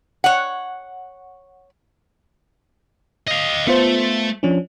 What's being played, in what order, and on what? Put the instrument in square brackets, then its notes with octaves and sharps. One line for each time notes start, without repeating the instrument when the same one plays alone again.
[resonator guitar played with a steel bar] C#5 F#5
[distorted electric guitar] D#5 F5
[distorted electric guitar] A3 [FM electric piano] B3 F4 C5
[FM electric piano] F3 C#4 D4